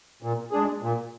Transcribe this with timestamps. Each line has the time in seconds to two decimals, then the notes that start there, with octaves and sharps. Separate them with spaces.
0.22 A#2
0.51 G#3 D4 G#4
0.82 A#2